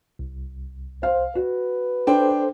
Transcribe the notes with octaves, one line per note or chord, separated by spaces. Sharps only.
C2
C5 F5
F#4 B4
D4 A4 C5 G5